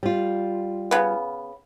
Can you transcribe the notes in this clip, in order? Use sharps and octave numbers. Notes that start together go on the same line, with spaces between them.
G3 F4
C#3 B3